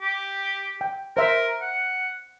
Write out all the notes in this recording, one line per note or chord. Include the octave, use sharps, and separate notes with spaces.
G4
G5
A#4 C5 E5
F#5